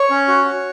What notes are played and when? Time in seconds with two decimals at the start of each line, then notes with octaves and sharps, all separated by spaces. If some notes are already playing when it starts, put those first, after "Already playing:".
Already playing: C#5
0.11 C#4
0.28 F#4
0.45 F#4